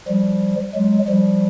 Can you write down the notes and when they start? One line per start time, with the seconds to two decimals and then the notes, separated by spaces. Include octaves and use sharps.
0.08 F3 G3
0.75 F#3 G#3
1.08 F3 G3